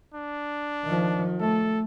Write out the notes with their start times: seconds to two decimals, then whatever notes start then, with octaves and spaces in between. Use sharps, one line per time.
0.14 D4
0.85 D#3 F3
1.40 A3 A4